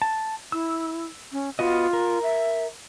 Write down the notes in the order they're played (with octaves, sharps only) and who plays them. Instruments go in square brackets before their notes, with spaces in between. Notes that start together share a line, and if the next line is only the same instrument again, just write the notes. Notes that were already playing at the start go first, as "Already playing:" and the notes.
[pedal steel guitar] A5
[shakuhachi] E4 [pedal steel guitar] E6
[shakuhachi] C#4
[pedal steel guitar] B3 F#4 D#5 [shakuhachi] F4
[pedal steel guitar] A#4
[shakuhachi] E5